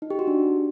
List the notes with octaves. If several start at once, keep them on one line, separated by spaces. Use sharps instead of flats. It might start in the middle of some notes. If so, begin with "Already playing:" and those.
D#4
G4
F#4
D4